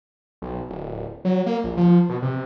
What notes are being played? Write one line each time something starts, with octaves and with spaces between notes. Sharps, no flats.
B1
D1
F#3
A#3
A#1
F3
B2
C3